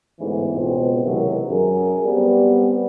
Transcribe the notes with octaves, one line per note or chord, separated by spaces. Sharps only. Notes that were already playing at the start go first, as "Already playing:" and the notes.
A1 G#2 D3 E3 B3
C#2 B2 C4
F#2 C3 D#3 E3 F#3 G#3
F#2 G#4 A#4
G3 B3 C4